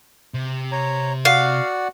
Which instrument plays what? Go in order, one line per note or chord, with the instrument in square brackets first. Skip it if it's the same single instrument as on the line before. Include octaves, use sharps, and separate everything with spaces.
[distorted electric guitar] C3
[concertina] C#5 A#5
[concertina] F#4 D5 F#5 [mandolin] F5